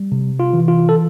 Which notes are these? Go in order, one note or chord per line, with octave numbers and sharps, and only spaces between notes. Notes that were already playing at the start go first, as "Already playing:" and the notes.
Already playing: G3
C3
F4
E3
F4
A4